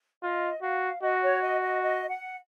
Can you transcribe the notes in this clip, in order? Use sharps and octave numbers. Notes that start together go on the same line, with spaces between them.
F4 D#5
F#4 F5
F#4 D#5
C#5
D#5
D#5
D#5
F#5